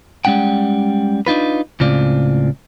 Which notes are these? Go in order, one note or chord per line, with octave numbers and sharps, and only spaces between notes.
G3 G#3 C#4 F#5 G5
D4 D#4 F4 B4
C#2 A2 C#3 C4 F4 D5